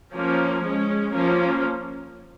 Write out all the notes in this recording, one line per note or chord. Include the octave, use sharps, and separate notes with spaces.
F3 A#3 C#4
G#3 C#4
F3 A#3 C#4